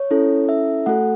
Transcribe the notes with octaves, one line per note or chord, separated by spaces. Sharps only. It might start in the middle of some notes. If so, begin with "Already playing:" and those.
Already playing: C#5
C#4 E4 A4
E5
A3 F#4 A4 F#5